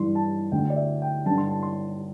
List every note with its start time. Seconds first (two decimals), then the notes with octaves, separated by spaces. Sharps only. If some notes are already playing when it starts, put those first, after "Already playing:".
Already playing: G2 E3 C6
0.15 A5
0.52 D2 D3 G5
0.70 D5
0.76 E5
1.02 G5
1.26 G2 D3 A5
1.38 C6
1.49 A5
1.63 C6